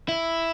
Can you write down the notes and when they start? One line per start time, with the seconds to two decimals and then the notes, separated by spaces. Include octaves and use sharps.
0.09 E4